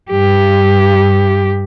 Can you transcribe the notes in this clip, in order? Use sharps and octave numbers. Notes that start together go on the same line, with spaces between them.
G2 G4